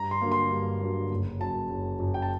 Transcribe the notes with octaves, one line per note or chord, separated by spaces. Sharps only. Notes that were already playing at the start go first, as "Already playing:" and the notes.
Already playing: G2 A#5
C6
D3 F#3 A#3
C6
G2
D3 F#3 A#3
F#1
F#2 F#3 A5
F#1
F#2 F#3
G5
A5